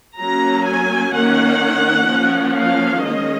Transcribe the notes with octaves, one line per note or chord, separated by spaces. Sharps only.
F#3 A#3 C#4 A#5
G#5
D#3 A#3 C#4 F#5
F3 A#3 C#4
F5
D#3 G#3 C#4 D#5